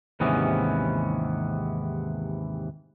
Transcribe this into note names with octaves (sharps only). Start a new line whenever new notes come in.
D#2 G#2 C3 E3 B3 C#4